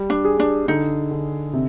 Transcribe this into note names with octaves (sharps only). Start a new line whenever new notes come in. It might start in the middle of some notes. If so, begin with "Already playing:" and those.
Already playing: G3
D4
G#4
D4
D3 D#4
D3
C3